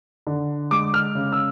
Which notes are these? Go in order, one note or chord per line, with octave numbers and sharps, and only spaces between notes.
D3
G#3 D6
F6
C#3
E6